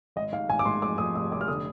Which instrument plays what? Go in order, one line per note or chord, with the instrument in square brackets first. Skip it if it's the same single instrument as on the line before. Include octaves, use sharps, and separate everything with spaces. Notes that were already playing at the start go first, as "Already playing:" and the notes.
[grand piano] G#1 [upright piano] D#5
[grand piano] G#2 [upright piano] F5
[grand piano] G#1 [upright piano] G#5
[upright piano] D6
[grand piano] G#2 [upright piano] C6
[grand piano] F2 [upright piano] D6
[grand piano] F2 [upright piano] D#6
[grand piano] F1 [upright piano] D#6
[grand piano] F1 [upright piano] D6
[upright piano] F6
[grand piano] D3 [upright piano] D#6